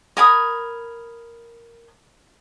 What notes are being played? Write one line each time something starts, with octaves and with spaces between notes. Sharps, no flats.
A#4 G#5 B5 D#6